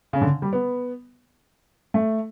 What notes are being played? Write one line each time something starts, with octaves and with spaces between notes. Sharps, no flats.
C#3
D3
G3
B3
A3